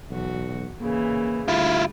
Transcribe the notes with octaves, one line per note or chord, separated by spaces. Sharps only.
B1 E2 F#4
A#2 C#3 E3 A#3
D2 G3 E4 F4